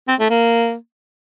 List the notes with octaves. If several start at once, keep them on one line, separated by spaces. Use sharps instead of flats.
C4
A3
A#3